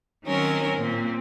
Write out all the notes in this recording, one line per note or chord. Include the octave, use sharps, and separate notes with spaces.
D#3 F#3 C4 C#4 A#4
A#2 C4